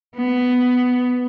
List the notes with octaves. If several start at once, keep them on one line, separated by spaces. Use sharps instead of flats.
B3